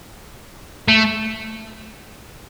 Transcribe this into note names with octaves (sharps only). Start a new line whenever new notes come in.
A3